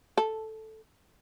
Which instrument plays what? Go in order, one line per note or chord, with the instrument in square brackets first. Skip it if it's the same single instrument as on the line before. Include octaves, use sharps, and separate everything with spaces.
[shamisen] A4